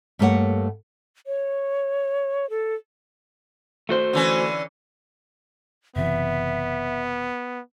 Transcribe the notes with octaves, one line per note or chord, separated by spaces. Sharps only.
G2 A3 A#3 E4 C#5 F#5
C#5
A4
A3 F#4 C5
D3 E3 C#4
F#1 C3 E3 B3 E5